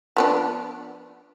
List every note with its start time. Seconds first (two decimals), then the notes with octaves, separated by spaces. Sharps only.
0.17 F3 B3 D4